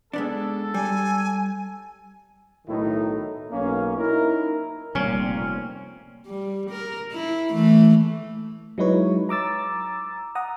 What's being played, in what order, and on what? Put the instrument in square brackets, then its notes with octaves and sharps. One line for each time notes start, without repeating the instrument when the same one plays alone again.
[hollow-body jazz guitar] G#3 B3 D4 [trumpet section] A4
[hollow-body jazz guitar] G3 [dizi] G#5
[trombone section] B1 A2 D#3 A3 D#4 E4
B1 A#3 C#4
D#4 E4 A#4
[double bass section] F1 A#3 C4 [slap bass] A#2 [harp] G3 [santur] C#4
[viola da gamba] G3
A#4
E4
E3 A3
[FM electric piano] F#3 G#3 D#4 E4 B4 C#5
A#5 D6 E6 A6
F#5 A#5 D#6